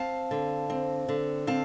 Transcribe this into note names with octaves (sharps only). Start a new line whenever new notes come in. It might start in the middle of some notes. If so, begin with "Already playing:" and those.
Already playing: C4 F5 A5
D3
C4
D3
C4 F5 A5